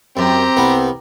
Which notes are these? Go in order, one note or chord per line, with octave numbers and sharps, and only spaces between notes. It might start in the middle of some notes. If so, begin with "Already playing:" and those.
F#2 C4 G4 A#5
C2 B3